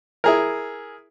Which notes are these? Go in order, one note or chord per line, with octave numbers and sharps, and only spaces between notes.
E4 G#4 A#4